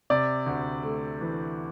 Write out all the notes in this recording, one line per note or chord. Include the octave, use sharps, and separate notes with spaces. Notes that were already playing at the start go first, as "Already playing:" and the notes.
C3 D5
D2
A3
E3